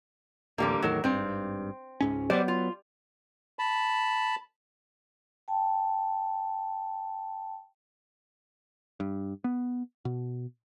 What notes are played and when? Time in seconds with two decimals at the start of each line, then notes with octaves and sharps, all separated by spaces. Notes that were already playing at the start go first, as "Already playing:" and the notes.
0.58 D1 A1 D3 G3 A#3
0.82 E2 A2 D#3 F#3 A#4
1.04 G#1 G2 C4
2.01 C#2 G#2 C#4
2.30 F#3 G3 B3 C5 D5
2.48 F4
3.59 A5 B5
5.48 G5 A5
9.00 G2
9.44 B3
10.05 B2